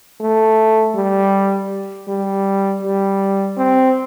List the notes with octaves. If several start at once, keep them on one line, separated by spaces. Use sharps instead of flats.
A3
G3
G3
G3
C4